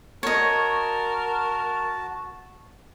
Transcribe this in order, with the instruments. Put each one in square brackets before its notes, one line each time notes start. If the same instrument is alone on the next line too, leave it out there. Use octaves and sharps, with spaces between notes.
[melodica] F#4 A5 [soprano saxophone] A#4 [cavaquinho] C#5 D#5